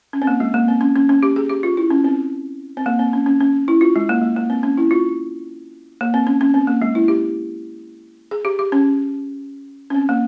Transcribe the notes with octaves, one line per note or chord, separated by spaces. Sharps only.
C#4
C4
A#3
G#3
A#3
C4
C#4
C#4
C#4
G4
G#4
G4
F4
E4
C#4
C4
C4
A#3
C4
C#4
C#4
C#4
E4
F4
G#3
A#3
G#3
A#3
C4
C#4
E4
F4
A#3
C4
C#4
C#4
C4
A#3
G#3
E4
G4
G#4
G4
G4
C#4
C#4
C4
A#3